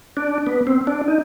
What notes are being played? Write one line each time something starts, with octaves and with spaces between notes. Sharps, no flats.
D4
B3
C4
D4
D#4